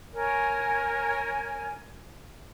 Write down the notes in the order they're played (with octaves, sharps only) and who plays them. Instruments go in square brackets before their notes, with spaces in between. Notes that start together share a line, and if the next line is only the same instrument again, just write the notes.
[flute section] A#4 C#5 G#5